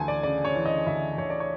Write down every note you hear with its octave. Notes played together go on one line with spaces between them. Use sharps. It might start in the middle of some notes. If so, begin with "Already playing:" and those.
Already playing: D2 E3 G#5 A5
D5
C#3 D5
C#5
E3
D#5
D2 E5
D2 C#5
D5
C#5